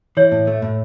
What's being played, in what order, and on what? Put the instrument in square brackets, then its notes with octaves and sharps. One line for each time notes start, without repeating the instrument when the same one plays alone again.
[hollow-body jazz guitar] E3 [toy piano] C#5
[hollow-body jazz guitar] A2
A3
A2